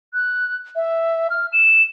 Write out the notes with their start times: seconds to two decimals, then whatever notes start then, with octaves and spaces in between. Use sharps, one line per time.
0.14 F#6
0.76 E5
1.30 F6
1.53 E7